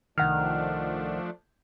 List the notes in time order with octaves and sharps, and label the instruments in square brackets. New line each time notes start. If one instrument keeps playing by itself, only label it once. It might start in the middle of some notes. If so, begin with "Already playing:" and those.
[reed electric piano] C2 F#5 F6 [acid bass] D#3 [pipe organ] F3 A3 D4